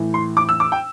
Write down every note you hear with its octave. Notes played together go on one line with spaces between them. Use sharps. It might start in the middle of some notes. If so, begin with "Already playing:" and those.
Already playing: A2 E3
C6
D6
E6
D6
G5